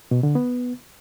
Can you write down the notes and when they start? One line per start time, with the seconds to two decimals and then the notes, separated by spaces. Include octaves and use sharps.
0.11 B2
0.23 D3
0.35 B3